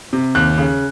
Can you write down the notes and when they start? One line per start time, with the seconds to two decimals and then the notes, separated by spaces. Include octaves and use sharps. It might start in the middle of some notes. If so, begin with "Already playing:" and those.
0.13 C3
0.35 D#2 F#6
0.58 C#3